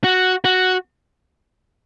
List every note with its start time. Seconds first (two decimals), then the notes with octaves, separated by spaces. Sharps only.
0.04 F#4
0.45 F#4